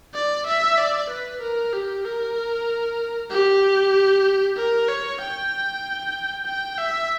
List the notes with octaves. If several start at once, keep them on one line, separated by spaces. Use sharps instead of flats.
D5
E5
D5
B4
A#4
G4
A#4
G4
A#4
C#5
G5
G5
E5